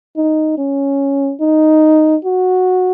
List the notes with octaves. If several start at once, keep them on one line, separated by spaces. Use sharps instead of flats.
D#4
C#4
D#4
F#4